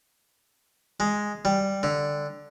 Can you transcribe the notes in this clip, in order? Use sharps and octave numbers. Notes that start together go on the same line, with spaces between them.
G#3
G3
D3